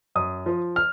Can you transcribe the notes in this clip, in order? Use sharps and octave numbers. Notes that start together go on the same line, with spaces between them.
F#2 D#6
F3
F6